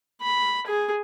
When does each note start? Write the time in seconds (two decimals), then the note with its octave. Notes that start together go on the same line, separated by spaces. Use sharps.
0.22 B5
0.67 G#4